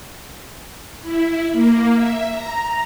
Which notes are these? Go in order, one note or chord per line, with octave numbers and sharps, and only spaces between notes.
E4
A#3
E5
A#5